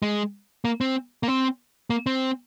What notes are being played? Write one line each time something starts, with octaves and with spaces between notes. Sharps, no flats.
G#3
A#3
C4
A#3
C4
A#3
C4